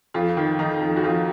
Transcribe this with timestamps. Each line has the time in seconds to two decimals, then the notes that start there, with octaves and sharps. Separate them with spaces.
0.14 F2 F4
0.37 D#3
0.59 D#3 D#4
0.81 F2
0.97 F#4
1.03 F2 F4